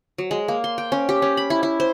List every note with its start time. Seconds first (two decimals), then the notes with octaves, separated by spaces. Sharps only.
0.18 F#3
0.31 G#3
0.48 A#3
0.64 C6
0.78 G5
0.92 C#4
1.09 G4
1.22 C#4
1.37 B5
1.50 E4
1.63 E4
1.80 C5